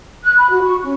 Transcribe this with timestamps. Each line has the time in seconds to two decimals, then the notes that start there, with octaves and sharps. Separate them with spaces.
0.24 F#6
0.38 B5
0.50 F#4
0.62 C#6
0.83 C#4